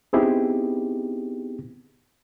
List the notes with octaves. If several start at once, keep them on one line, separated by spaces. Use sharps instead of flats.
B3 C4 D#4 E4 G4 G#4